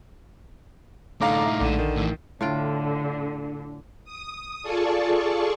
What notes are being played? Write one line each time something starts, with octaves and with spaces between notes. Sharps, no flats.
A2 D3 D#4 F5 A#5 D6
E5
A#1 D3 D#7 E7
D#3
A2 E3
A2 D3 F4 G5
D#6
F4 G#4 A4 D5 A5 C#6